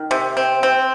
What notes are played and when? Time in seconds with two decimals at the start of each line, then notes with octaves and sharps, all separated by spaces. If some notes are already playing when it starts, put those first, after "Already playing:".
Already playing: D#3
0.11 C3
0.37 C4
0.63 C4